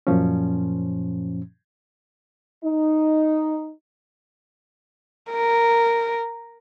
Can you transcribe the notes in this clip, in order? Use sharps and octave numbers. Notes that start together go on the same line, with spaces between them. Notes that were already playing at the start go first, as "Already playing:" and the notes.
F#2 A#2 F3 C#4
D#4
A#4